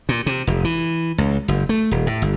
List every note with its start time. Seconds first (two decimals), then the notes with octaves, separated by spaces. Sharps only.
0.09 A#2
0.26 C3
0.47 F1
0.64 E3
1.18 C#2
1.48 F#1
1.69 A3
1.91 D#1
2.07 A2
2.22 G1